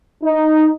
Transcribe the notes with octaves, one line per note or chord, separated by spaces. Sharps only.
D#4